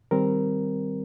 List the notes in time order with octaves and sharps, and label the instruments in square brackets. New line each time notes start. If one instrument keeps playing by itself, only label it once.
[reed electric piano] D#3 G3 C4 A#4